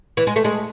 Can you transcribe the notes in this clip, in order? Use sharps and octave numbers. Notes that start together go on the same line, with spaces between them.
E3
G#3
A3
G#3